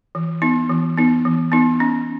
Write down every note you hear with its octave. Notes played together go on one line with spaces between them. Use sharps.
E3
B3 D#4
E3
B3 D#4
E3
B3 D#4
C#4